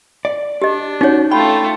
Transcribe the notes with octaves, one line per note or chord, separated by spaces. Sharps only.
D5
D4 G4 D#5
C#4 D#4 F#4 C#5
A3 F4 G5 B5